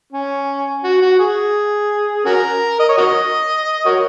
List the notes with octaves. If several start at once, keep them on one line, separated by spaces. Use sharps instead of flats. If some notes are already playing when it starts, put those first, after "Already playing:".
C#4
F#4
F#4
G#4
C#4 F#4 A#4
D#5
C#5
F#4 A#4 D#5
F#4 A#4 C#5